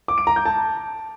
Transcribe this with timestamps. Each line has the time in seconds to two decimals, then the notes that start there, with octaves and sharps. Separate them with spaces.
0.08 D6
0.18 D7
0.27 A#5
0.36 G6
0.45 A5